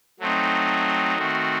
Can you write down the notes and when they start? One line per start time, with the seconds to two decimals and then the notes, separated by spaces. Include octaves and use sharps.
0.20 F#3 A3 C4 D#4
1.18 D#3 A3 C4 F#4